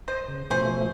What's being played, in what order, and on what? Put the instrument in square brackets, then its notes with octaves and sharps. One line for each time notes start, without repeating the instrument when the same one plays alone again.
[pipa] C5 [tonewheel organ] D#5
[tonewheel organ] C#3
[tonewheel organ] B2 F3 A3 [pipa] C#4 G#4 C5